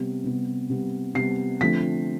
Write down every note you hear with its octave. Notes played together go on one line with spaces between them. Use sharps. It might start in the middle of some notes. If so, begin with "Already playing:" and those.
Already playing: C3 G3 B3
C3 G3 B3
C3 G3 B3
C3 G3 B3 C7
D3 F3 A3 C4 B6